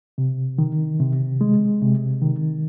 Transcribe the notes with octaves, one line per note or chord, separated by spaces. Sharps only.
C3
D#3
C3
G#3
C3
D#3